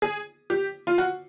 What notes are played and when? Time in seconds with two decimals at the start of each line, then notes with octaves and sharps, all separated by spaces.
0.02 G#4
0.50 G4
0.87 F4
0.98 F#4